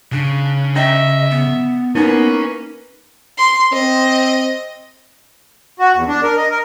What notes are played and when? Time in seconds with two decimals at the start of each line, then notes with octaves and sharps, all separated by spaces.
0.12 C#3 D4
0.76 C#4 D#5 E5 A#5
1.30 B3
1.95 A#3 B3 C#4 D#4 E4 B4
3.38 C6
3.73 C4 D#5
5.80 F#4
5.95 E2
6.08 D4
6.23 A#4
6.37 D#5
6.50 A#4